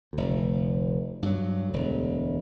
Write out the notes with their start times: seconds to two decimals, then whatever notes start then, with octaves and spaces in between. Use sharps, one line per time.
0.13 F1 D2
1.22 G2 F#3
1.69 E1 D2